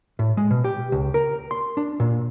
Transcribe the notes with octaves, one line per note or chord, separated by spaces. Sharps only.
A2
G#3
B2
G4
C#2
A#4
C6
D4
A#2